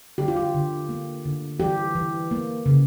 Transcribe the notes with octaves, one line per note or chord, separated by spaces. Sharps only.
D3 G4
F4
G4
D3
A#3
D3
E3 G4
E3
A#3
C#3